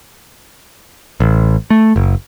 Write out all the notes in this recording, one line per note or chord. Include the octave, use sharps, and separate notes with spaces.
A1
A3
F#1